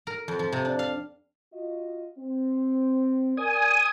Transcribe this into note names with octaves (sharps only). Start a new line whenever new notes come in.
A#4
F2
F3
C3
D4
F5
F4 F#4 D#5
C4
A#4 D5 G#5 D#6